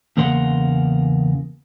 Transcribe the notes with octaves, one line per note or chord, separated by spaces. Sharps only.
E2 C#3 A#3 A#4 F#5 C6